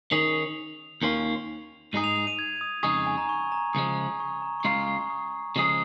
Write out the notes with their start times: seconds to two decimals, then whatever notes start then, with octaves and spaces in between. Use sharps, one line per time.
0.11 D#3 C#4 G#4 F7
1.02 D#2 D#3 C#4 F4
1.92 G#2 G#3 D#4 G#4 D#7
2.04 F7
2.16 F7
2.27 D#7
2.39 G#6
2.61 D#6
2.83 F2 C#3 G#3 D#4 G#4 C#6
3.07 G#5
3.18 A#5
3.29 C#6
3.52 A#5
3.74 C#2 C#3 F3 G#3 D#6
4.20 C#6
4.42 A#5
4.60 C#6
4.64 C#2 C#3 G#3 F4 A#5
4.88 C#6
5.10 D#6
5.56 C#3 F3 G#3 C#4 G#4